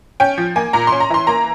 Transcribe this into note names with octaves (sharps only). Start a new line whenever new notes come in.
C#4 G5
F3
A#3 G#5
A#2 A#5
C6
C#4
A#5
E3 C6
A#3 A#5